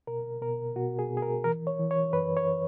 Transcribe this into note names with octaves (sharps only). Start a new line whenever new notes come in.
B2 A#4
B2 A#4
B2 F#4
G#4
B2
G#4
A#4
E3 A#4
C#5
E3
C#5
F#2 B4
C#5